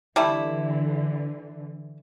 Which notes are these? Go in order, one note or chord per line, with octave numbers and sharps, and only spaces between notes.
D3 E3 G3 A3 E4